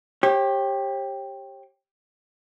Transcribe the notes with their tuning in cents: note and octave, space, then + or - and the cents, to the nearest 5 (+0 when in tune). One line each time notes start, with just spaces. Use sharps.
G4 +5 C#5 -40